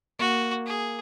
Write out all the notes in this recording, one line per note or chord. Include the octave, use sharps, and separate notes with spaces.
A#3 F#4
G#4